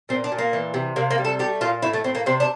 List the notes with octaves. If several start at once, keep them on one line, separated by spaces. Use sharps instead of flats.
A#2 C4
D4
A#2
A#3
E3
C3
C3 A#3
A#3
G3
A4
A3 G4
A#2 F4
A2 E4
A3
A2 C4
A#3
C3 C4
D4